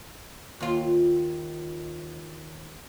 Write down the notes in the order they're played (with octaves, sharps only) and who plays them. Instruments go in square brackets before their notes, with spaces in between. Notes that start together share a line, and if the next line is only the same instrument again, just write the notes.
[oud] D#2 F4